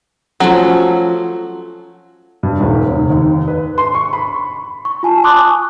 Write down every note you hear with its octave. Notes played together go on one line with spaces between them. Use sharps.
F3 F#3 A3 C#4
G2
D#1
F1
D#2
B4
C6
C#6
B5
C#6
F4 G#5 A5
G#5 A5 C6 D6 D#6 F#6
C#6